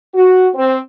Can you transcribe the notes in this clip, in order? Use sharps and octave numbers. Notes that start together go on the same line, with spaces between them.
F#4
C4